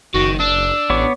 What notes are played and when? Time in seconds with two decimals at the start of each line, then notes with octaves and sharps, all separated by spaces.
0.14 F#1 D#3 F#4
0.40 D4 E6
0.90 A1 B3 C#5 D6